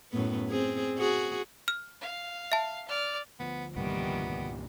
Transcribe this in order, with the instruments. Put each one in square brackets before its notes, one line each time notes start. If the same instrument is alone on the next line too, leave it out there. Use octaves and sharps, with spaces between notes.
[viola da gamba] F#2 A2 B3
C4 G#4
F#4 G#4
[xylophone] F6
[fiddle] F5
[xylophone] E5 A5
[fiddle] D5 F6
[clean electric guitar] D2 F3 [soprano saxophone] B3
[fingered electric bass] C2 G2 A#2 [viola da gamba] D#3 E3 G3 [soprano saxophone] B3